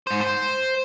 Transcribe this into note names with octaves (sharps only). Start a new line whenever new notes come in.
G#2 C5
C5